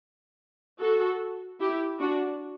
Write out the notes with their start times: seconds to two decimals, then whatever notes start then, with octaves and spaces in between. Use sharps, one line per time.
0.80 F#4 A4
1.59 E4 G4
2.00 D4 F#4